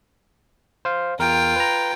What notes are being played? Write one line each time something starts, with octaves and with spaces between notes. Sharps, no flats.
C5 F5
E2 F4 A#4 G5
B4 A#5